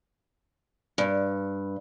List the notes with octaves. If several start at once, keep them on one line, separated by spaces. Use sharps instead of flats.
G2